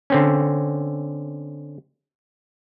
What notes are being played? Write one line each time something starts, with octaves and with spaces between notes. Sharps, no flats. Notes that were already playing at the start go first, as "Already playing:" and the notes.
D3 C4 C#4